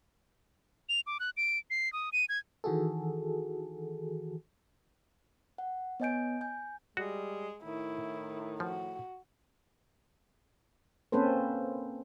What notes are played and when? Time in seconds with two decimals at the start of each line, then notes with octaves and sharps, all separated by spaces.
0.89 F7
1.07 D6
1.20 F#6
1.37 D7
1.70 C7
1.93 D#6
2.13 D#7
2.29 G#6
2.64 D#3 E3 F#4 G#4 A4
5.58 F#5
6.00 B3 C#5 D#5 G#5 G6 D7
6.41 G#5 G6
6.97 G3 G#3 F#4
7.63 A2 D#3 E4
8.60 F3 F#4
11.12 A#3 C4 C#4 A4 B4 C5